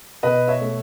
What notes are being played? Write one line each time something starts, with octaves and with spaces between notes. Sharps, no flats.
B2 B4 D#5
C#5 E5
A3